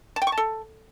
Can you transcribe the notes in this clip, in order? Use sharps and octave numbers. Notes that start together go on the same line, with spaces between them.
A5
G5
C#6
A5
A4